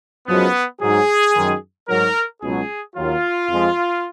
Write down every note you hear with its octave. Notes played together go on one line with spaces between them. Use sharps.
F#2 F3 G#3 B3
G#2 F#3 G#4
F#2 D#3 G#3
G#2 F#3 A#4
C#2 B2 F#3 G#4
D#2 D#3 F#3 F4
F2 F3 G#3